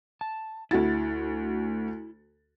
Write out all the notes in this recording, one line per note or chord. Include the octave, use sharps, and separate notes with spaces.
A5
D2 E4 F#4 A6